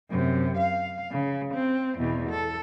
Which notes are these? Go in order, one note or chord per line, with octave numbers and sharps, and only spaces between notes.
F#2 C3
F5
C#3
C4
E2 B2
A4